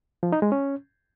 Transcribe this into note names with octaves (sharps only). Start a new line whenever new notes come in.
F3
D#4
G#3
C#4